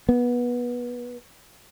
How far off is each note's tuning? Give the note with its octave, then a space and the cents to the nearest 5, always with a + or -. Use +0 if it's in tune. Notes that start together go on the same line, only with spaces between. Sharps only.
B3 -20